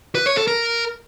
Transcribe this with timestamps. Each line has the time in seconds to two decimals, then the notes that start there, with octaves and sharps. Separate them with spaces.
0.15 B4
0.26 C#5
0.37 A4
0.48 A#4